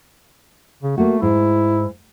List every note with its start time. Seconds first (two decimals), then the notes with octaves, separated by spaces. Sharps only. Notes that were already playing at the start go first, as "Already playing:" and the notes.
0.83 C#3
0.98 A3 A#3 F#4
1.22 G#2 E4